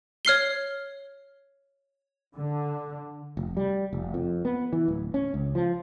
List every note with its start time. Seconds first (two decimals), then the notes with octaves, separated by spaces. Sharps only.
0.25 C#5 F6 C7 G7
2.35 D3
3.37 F1
3.57 G3
3.93 F1
4.14 F2
4.45 B3
4.73 E3
4.88 D1
5.14 C#4
5.34 C#2
5.55 F3